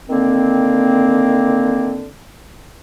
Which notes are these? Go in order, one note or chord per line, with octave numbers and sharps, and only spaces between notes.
D3 D#3 A#3 C4